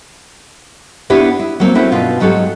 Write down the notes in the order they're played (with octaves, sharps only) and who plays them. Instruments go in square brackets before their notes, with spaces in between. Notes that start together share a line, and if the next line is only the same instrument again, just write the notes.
[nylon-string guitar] B3 D4 E4 G4 C#5
E4
F#3 A#3 C4
A3 C4 C#4 E4 F#4
G2 B2 F4
G#2 F#3 F#4 G4 A4